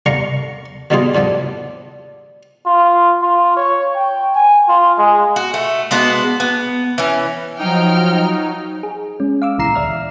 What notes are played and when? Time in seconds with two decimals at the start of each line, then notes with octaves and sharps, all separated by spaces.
0.06 C2 D3 F5 A#5 C#6
0.90 B2 D3 D#3 G3 F4 G#4
1.15 A2 D3 F3 G3
2.66 F4
3.22 F4
3.57 C#5
3.95 G5
4.35 G#5
4.68 F4
4.98 G#3
5.36 F#4
5.54 A3
5.91 G#3 B3 D4 F#4
6.40 B3
6.98 E3 C#4
7.59 F3 F#3 D#4 G5 F6
8.83 G#4
9.20 G#3 C#4
9.42 F5 D6 E6
9.58 C#2 A#2 E3 A#5 C7 E7
9.75 D2 D5 E5 F6